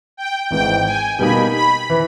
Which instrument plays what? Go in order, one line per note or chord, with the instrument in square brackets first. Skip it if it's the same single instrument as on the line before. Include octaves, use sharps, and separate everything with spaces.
[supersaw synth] G5
[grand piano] G#1 G#2 E3 [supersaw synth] G5
[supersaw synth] G#5
[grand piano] B2 G3 A#3 D#4 [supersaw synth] B5
[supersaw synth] B5
[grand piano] E3